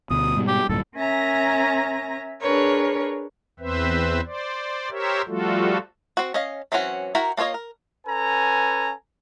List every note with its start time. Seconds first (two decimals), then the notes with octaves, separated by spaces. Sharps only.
0.10 D2 B2 D#6
0.36 G#2 B2 G3
0.48 G4
0.69 D1 G2 A#2 A4
0.95 C#4 A#4 E5 G#5 A#5 A#6
2.41 D4 G#4 A#4 B4 C#5
3.60 E2 C4 B4 C5 E5
4.25 C5 D5
4.90 G4 A#4 C5 C#5 E5
5.28 F3 G3 A3 F4 F#4 A4
6.17 C4 F#4
6.34 C#4 D#5 F5
6.72 E3 F#3 C4 C#4 F#4
7.15 E4 F#4 A#4 G5 A#5
7.37 A#3 D4 F4 C#5 D#5
7.54 A#4
8.07 C#4 A4 B4 G#5 A#5